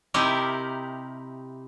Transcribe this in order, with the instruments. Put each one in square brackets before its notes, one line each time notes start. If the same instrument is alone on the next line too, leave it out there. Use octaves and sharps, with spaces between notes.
[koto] C3 D#4 E4 G4 A#4